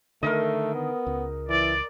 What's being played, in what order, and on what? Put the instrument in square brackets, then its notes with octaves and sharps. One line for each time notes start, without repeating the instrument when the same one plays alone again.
[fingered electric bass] D3 D#3 [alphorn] A3 [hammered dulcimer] A#4 D#5
[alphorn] B3
[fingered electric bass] C#2
[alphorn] E3 [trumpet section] D5